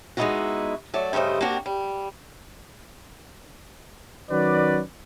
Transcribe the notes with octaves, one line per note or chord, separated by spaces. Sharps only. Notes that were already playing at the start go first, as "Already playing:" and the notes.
G#3 B3 C4 D#4 E4 F#4
F#3 A3 D5
G2 C#3 A3 C5 D#5
A#3 C4 D4 F#4 G4
G3
D#3 F#3 C#4 F#4 B4 D5